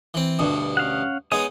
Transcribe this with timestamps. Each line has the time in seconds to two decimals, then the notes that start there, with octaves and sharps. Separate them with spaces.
0.14 E3 C4
0.39 D2 G2 B2
0.77 C#4 F5 F#5
1.32 G#3 B3 D#4 C#5 G#5 D#6